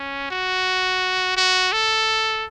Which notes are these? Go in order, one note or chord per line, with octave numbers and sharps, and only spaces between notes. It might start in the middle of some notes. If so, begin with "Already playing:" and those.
Already playing: C#4
F#4
F#4
A4